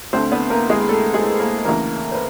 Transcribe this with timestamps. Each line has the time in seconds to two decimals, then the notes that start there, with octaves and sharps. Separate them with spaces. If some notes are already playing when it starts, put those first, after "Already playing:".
0.13 D2 D3 C4 C5
0.32 B3 B4
0.50 A#3 A#4
0.69 G#3 G#4
0.89 A3 A4
1.14 G#3 G#4
1.39 A#3 A#4
1.65 D2 C#3 E3 A#3 A#4
2.11 C5
2.15 B4